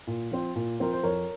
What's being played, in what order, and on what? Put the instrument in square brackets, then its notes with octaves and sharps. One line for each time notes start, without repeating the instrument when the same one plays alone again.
[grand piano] A#2
F3 C4
A#2
F3 C4 A#4
C5
F2 A#4 C#5